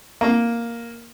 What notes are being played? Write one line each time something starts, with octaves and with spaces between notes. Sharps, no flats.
A#3